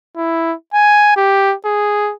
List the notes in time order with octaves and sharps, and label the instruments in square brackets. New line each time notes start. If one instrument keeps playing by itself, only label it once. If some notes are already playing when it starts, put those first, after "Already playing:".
[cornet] E4
G#5
G4
G#4